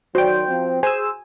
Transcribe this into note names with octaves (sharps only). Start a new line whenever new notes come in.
D#3 F#3 F#4 C5 D5 G5
F3 C4
G#4 C5 G#5 E6